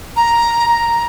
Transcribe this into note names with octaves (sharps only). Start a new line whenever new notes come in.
A#5
A#5